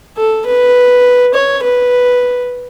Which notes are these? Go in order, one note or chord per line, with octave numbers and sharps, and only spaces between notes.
A4
B4
C#5
B4